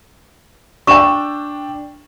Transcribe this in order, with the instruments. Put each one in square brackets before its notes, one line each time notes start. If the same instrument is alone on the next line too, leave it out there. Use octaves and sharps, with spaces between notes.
[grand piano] D4 E7 [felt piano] G5 E6 [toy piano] C#6